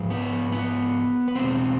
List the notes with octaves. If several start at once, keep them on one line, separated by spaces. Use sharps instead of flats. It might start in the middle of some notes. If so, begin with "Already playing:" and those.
Already playing: G#2 F3 G#3
B3 B4
B3 B4
B4
E2 B2 G#3 C4 C5